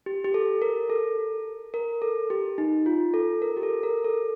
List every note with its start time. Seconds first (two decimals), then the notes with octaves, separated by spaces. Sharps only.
0.06 G4
0.24 G4
0.34 A4
0.62 A#4
0.90 A4
1.74 A#4
2.02 A4
2.30 G4
2.58 D#4
2.86 F4
3.14 A4
3.42 A#4
3.57 G4
3.63 A4
3.83 A#4
4.04 A4